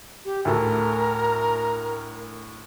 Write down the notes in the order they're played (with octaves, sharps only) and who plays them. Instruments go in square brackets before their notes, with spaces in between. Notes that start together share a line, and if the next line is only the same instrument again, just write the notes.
[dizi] G4
[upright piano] D2 A2 A4 [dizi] A#4